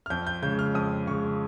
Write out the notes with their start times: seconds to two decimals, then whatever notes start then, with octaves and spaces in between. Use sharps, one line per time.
0.06 F6
0.10 F2 G6
0.27 G6
0.42 C#3 G#3 G6
0.59 F6
0.75 F2 D#6
1.07 C#3 G#3 C#6